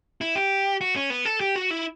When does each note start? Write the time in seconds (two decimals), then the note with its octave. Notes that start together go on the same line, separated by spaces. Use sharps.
0.21 E4
0.35 G4
0.81 F#4
0.96 C#4
1.10 B3
1.25 A4
1.40 G4
1.56 F#4
1.70 E4